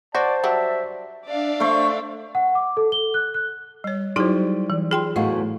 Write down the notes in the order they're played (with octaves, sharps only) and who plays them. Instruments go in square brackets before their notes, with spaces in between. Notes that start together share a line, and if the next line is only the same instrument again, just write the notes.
[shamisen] F#4 [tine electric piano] C5 [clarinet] D5 [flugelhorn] A5
[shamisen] F#3 G3 D4 [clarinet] E5
[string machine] D4 [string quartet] D5 E5 F5
[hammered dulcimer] A3 C5 [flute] C#6
[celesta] F#5
D6
A4
G7
F#6
F#6
[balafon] G3 C#5
[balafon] F#3 F#4 C5 [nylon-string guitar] G3 [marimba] D#4 E4 G#4
[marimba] E3
[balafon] F4 [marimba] G#4 G5 C6
[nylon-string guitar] E2 A2 F#4 [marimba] D#5 [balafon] F5